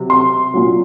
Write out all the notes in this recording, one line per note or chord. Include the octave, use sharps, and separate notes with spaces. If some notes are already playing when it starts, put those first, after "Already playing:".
Already playing: C3 F#3
C6
A#2 F#3